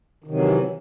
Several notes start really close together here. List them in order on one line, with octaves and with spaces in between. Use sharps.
D#3 C3 F#3 E3